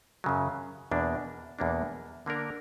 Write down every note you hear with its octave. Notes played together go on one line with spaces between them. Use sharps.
F#2 C#3 F#3
E2 B2 A#3 D4
E2 B2 A#3 D4
D3 A#3 D4 A#4